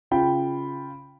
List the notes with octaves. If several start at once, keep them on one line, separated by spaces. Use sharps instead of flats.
C#3 F4 G5 B5